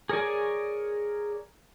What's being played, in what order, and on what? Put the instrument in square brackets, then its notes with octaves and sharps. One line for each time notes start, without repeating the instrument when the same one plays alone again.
[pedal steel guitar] G#4 A#4 C#5 D5 G#5